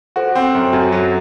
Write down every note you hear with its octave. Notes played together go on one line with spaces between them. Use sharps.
F#4 A4 C5
C4
F#2
F#2 F#4 A4
F#3